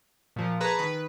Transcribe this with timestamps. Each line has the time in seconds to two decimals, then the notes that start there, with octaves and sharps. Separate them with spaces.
0.36 A#2 F3
0.60 G#4 B4 A5 A#5 C#6
0.79 D#3 B4